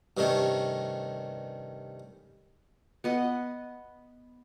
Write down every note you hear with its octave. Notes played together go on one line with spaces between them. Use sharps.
G2 C3 D#3 A3 C#4
B3 D#5 F#5